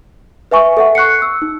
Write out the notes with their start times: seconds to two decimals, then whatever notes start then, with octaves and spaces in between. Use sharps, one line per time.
0.51 B4 E5 G#5 C#6
0.77 A4 E5 F#5
0.95 C#6 F#6 C7 C#7
1.22 E6
1.42 D#4